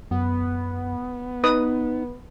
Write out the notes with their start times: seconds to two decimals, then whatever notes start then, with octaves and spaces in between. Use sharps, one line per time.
0.11 F#2 B3
1.44 D#4 B4 D#6